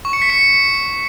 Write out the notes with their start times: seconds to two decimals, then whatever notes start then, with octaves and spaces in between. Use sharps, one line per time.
0.05 C#6
0.13 C#7
0.22 B6
0.30 C#7